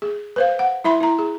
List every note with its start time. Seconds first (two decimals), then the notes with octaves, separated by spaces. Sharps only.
0.02 G#4
0.36 B4 C5 F5
0.59 F#5
0.84 E4 E5 B5 C6
1.00 E4 A#5
1.19 G#4